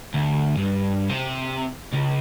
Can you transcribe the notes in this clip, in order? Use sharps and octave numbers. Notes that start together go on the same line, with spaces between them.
D2
G2
C3
C#2